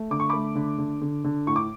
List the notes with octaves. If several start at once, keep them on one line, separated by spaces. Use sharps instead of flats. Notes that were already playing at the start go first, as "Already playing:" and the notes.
Already playing: A3
D3 D6
C#6
A3 B5 D6
D3
D3
D3
D3
A2 C#6
D6